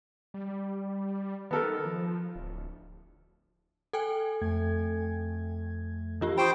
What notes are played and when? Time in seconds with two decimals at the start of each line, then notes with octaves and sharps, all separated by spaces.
0.34 G3
1.51 D#3 B3 A4 A#4
1.85 F3
2.35 D1
3.93 A4 G5 G#5
4.41 F2 A3 G#6
6.21 E3 F4 G4
6.38 C5 G5 B5 C#6 D#6